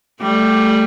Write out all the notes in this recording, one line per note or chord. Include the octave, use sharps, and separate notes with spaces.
G3 A3